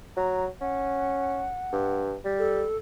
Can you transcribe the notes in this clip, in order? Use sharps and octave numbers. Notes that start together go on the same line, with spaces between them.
F#3 A#5
C#4 F#5
G2
G3
A4